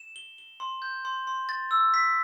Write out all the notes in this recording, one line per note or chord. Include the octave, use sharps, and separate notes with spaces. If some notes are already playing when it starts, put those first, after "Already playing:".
Already playing: E7
G7
G7
C6
G6
C6
C6
A6
E6
B6